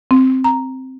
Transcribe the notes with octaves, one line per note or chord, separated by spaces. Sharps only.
C4
A#5